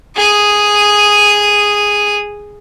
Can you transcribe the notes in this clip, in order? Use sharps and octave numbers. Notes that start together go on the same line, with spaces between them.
G#4 D#6